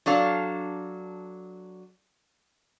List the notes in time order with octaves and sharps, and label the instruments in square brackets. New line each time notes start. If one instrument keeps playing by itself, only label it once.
[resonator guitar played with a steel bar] F#3 D4 A4 F5